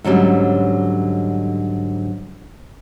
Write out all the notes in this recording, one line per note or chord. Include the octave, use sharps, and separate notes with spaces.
G#2 D3 F#3 G3 C#4